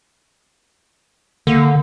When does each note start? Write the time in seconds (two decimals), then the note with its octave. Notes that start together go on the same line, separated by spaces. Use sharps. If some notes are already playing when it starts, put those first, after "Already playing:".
1.47 D3 A#3